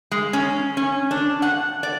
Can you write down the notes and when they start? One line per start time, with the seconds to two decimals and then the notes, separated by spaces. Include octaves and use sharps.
0.11 G#3
0.33 C#4
0.77 C#4
1.11 D4
1.42 F#5
1.83 D5